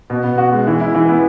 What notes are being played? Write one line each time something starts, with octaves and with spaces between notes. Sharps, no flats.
B2
B3
F#4
G#3
E3
E4
E3
B3